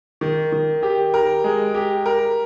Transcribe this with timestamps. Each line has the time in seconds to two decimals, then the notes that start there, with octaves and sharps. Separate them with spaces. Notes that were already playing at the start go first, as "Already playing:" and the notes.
0.21 D#3
0.52 D#3
0.83 G4
1.14 A#4
1.44 G#3
1.75 G4
2.06 A#4